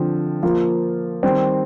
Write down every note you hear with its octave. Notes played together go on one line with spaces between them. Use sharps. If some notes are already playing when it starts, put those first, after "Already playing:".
Already playing: D3 F3 C4
F3 A#3 F4
D#3 G3 C4